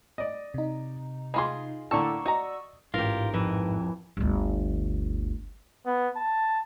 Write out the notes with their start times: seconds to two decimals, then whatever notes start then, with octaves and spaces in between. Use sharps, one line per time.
0.18 D5 D#5
0.54 C3 D#4
1.34 G#3 F4 G#4 B5 C6
1.91 A2 D3 A#3 D5 A5 C#6 E6
2.26 F#4 D#5 A#5
2.94 A1 G#2 F4 G4 A#4
3.34 F2 E3
4.17 G1 D2
5.86 B3
6.16 A5